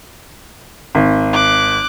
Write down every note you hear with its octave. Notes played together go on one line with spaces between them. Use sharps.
G#1
D6 F#6